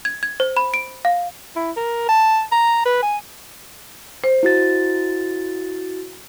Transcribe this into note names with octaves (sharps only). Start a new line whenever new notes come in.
G#6
G#6
C5
B5
D7
F5
E4
A#4
A5
A#5
B4
G#5
C5
E4 F#4 A6